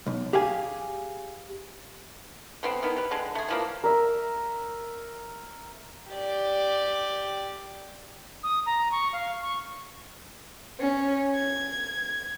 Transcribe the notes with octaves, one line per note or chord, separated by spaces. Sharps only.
B1
G4 G#4 F5 G#5
D3 B3 C4
D#3 B3 C4 E4
G4 B4
D3 G#3
A3 G#4
E3 F3 A#3
A#4 E5
G4 D5
D#6
A#5
C#6
F5
C#6
C#4
G#6